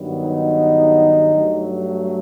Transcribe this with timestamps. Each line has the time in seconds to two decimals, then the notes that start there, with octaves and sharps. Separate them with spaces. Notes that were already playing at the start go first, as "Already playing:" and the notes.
Already playing: G2 D#3 F#3 B3
0.25 D#4
1.34 G2 F#3 A3